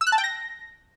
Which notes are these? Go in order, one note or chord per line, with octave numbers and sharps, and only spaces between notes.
E6
F#6
A5
G5
A#6